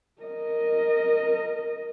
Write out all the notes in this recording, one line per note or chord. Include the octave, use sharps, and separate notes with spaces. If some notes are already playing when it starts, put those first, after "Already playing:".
A#4 D#5